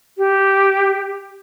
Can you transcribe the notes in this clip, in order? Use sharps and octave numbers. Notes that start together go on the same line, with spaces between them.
G4